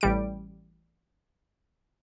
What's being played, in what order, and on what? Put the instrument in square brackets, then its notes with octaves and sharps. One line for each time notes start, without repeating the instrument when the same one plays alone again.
[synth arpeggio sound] A1 G3 D7